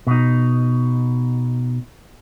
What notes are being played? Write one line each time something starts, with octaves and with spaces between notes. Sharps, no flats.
B2 D#4